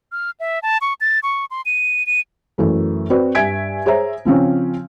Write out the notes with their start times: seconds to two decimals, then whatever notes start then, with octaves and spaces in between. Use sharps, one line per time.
0.12 F6
0.40 E5
0.63 A5
0.81 C#6
1.01 A6
1.23 C#6
1.51 C6
1.66 D#7
2.07 D#7
2.58 F#2 E3 A3
3.10 C4 F#4 B4 C5 D5
3.35 G2 E5 G#5 G#6 B6 D7
3.86 G#4 C5 C#5 E5 A#5
4.25 C#3 F3 C4 C#4